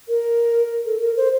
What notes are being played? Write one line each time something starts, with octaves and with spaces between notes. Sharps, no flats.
A#4
A4
A#4
C5